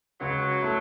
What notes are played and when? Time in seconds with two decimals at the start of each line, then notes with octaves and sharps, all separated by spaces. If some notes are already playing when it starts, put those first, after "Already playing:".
0.21 C#2 F#3
0.62 A3 E4